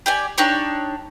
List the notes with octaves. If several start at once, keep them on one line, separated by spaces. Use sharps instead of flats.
G4 D5 G#5
D4 D#4 G4 C#5